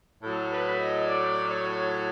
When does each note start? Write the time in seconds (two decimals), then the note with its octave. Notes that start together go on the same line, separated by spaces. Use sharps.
0.23 A2 F#3 A4
0.51 B4
0.79 D#5
1.07 D5
1.49 C#5